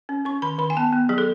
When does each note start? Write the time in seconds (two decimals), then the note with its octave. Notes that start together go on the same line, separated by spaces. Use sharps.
0.09 C#4
0.25 C#4 C#6
0.42 D#3 B5
0.59 D#3 B5
0.70 G#5
0.77 B3 A5
0.92 B3
1.09 F#3 G#4
1.18 A4